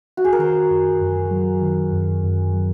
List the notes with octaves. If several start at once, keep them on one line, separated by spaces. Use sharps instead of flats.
F#4
G#4
A#4
D#3 C5
F#2
F#2
F#3
D#3
F#2
F#2
F#3